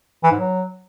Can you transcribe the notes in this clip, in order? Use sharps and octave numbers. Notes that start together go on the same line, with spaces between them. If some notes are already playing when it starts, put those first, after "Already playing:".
E3
G#2
F#3